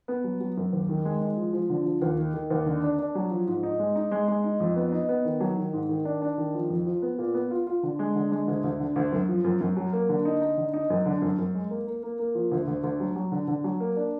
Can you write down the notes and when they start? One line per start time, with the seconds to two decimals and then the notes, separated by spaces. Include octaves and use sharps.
0.08 B3
0.24 F#3
0.40 F#3
0.57 F#2
0.73 D#2
0.89 D#3
1.05 G#3
1.21 G#3
1.37 F3
1.53 F3
1.70 D3
1.85 F3
2.02 D#2
2.18 D#3
2.34 D#3
2.51 D#2
2.66 D3
2.83 D4
2.99 D4
3.15 F#3
3.31 F3
3.47 G#2
3.63 D#4
3.79 G#3
3.96 D#4
4.11 G#3
4.28 G#3
4.44 D#4
4.60 F2
4.76 B3
4.92 D#4
5.09 B3
5.25 D#3
5.40 F#3
5.57 D#3
5.73 G#2
5.89 D#3
6.05 D4
6.22 D4
6.38 D#3
6.54 F3
6.70 F2
6.86 F3
7.02 B3
7.18 A#2
7.34 B3
7.51 F4
7.67 F4
7.83 D3
7.99 G#3
8.15 D3
8.32 G#3
8.48 D2
8.64 D2
8.80 D3
8.96 D2
9.12 F#2
9.28 F3
9.44 F#2
9.61 F#2
9.77 F#3
9.93 A#3
10.09 D3
10.25 D#4
10.42 D#4
10.58 D3
10.73 D#4
10.90 F#2
11.06 D3
11.22 F#2
11.38 F#2
11.54 G#3
11.71 A#3
11.87 A#3
12.03 A#3
12.19 A#3
12.35 F3
12.51 D2
12.68 D2
12.84 D2
13.00 F#3
13.16 F#3
13.32 D3
13.48 D3
13.64 F#3
13.80 A#3
13.96 D4